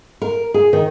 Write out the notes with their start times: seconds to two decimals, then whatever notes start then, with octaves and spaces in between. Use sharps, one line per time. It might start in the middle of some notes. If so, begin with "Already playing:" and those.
0.22 A#4
0.54 G#4
0.73 D#3